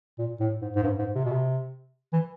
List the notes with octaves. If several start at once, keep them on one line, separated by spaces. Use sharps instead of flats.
A#2
A2
G#2
G#2
G2
G#2
C3
B2
C3
E3